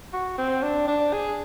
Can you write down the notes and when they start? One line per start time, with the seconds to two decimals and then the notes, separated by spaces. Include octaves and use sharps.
0.13 F#4
0.38 C4
0.63 D4
0.87 D4
1.13 G#4